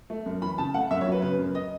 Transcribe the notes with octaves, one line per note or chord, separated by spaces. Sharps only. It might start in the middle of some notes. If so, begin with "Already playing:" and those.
A3
F#2
E3 B5
C#3 A5
A3 F#5
F#2 E5
C#5
F#3 B4
C#3 B4
F#2
D#5